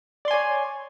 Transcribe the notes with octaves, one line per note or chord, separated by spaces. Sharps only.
C#5 D5 G#5 C6